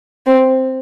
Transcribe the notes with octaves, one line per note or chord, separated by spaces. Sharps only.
C4